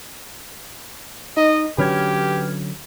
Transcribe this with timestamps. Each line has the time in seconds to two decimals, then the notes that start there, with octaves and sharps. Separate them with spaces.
1.37 D#4 D#5
1.78 D3 F#3 C#4 G4 B4 F6 G#6